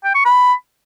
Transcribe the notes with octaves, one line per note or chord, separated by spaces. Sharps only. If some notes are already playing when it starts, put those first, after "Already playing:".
G5
C#6
B5